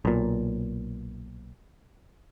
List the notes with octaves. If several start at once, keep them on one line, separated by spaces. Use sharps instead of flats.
B1 A#2